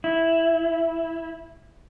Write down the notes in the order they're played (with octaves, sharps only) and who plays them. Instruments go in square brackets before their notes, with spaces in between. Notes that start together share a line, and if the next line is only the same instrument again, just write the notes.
[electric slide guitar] E4